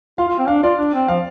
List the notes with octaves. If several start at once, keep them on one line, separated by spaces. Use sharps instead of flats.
F4 F5
F4
C4
D4 F5
F4 D5
D4
C4
F3 F5